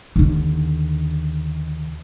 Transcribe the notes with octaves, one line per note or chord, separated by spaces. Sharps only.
D#2 D3